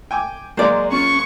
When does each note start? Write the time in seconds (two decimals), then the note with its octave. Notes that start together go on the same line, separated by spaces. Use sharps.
0.11 G5 G#5 D6
0.57 F#3 G#3 A#3 C5 D5
0.92 C#4 F4 C#6